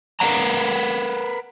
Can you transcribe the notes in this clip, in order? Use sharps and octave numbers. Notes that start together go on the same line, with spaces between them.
A#4 B4 F5 F#5 A#5